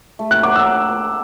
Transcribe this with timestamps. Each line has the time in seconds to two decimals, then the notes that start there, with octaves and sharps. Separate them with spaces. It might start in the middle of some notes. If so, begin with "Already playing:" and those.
0.19 A3
0.31 F#6
0.43 F#3 D6
0.56 E6